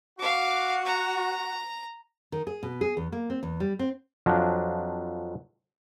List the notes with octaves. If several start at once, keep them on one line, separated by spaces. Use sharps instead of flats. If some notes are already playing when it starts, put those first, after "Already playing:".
F#4 F5 D6
A#5
D#3
G#4
B2
G#4
E2
A#3
C4
E2
G3
C4
F2 F3 F#3 D4